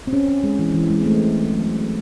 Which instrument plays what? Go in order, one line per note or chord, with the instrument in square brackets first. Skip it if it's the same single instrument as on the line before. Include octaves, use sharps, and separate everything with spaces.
[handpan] C4
C#4
C#4
G#3
E3
E3
G#3
C4
A3
F#3